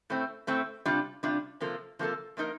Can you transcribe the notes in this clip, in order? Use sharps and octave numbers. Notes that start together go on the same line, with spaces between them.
A2 A3 C4
A2 A3 C4
C3 G3 D4 F4
C3 G3 D4 F4
C3 F3 A#3 F4 A4
C3 F3 A#3 F4 A4
F3 A#3 D#4 A#4